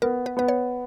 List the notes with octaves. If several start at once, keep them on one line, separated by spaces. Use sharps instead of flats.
B3 A#4
B4
B3 B4
C#5